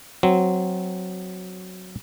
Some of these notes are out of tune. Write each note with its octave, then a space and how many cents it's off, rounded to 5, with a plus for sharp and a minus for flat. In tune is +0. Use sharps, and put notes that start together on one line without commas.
F#3 +0 C4 -5